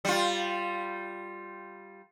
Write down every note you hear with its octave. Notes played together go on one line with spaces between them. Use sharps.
G3 F4